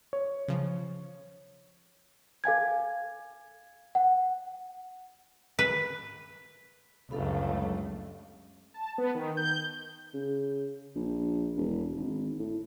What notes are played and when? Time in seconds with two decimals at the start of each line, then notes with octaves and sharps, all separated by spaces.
0.13 C#5
0.48 C#3 F3
2.44 A4 F5 G#5 G#6
3.95 F#5
5.59 B4
7.11 G1 C#2 F#2 A3 A4 F5 B5
8.74 A5
8.98 B3
9.15 D#3
9.37 G6
10.14 C#3
10.95 A#1
11.56 E1
11.96 G#1
12.39 A2